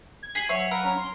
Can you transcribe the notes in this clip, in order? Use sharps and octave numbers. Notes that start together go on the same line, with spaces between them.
G#6
G#4 G#5 B6 C7 F#7
F#3 C#5 E5 F#5
A#4 B4 F5
C#4 A#5
C6